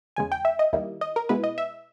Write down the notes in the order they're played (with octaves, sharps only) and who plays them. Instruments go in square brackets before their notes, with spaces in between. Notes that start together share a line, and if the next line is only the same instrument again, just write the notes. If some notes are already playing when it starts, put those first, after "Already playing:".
[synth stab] E2 C#3 G#3 G#5
G5
E5
D#5
D#2 D#3 G3 A#3 E4
D#5
A#4
B2 G#3 B3 E4 B4
D#5
E5